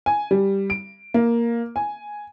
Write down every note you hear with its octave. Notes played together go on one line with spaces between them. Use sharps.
G#5
G3
D7
A#3
G#5